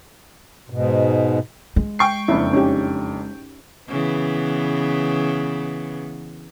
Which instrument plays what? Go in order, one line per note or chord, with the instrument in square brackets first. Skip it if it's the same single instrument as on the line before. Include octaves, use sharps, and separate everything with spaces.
[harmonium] G#2 B2
[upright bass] G#3
[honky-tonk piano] G5 C#6 C7
[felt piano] F#1 F2 D4 [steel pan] E4
[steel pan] C#4 D#4 G4
[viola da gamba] C#3 E3 B3